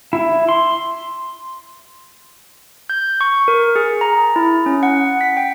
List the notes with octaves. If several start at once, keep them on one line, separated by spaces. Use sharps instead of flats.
E4
C6
G6
C#6
A#4
G#4
A#5
E4
C#4
F#5
B6
G5